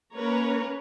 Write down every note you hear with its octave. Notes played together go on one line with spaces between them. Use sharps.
A#3 C#4 A#4 B4 C#5 A#5